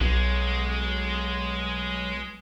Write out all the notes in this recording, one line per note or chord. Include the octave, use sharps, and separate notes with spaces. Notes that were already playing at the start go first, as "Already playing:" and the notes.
B1 F#3 G#3 B3